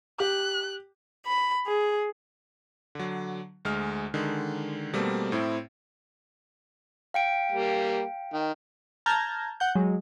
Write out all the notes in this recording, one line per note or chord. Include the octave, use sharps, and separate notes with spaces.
G4 F#6
B5
G#4
D3 F#3
D2 G#3 F6
D3 D#3 G#3
B2 G3 A3 A#3 C4
A2 C4 E4
F5 G5 D7
G3 A#3
D#3
A5 A#5 F6 G6 G#6
F#5 G6
F#3 G#3